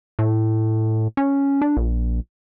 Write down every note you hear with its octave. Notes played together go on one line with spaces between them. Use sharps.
A2
C#4
D4
A#1